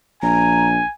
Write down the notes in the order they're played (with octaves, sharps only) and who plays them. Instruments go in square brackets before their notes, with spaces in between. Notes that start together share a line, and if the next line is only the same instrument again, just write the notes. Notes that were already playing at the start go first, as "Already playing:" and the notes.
[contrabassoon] A#1 [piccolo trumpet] G#5 [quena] A#5